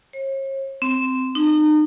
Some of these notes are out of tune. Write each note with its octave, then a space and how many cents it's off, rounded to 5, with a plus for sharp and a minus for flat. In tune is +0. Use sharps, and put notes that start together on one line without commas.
C#5 -45
C4 -15
D#4 -35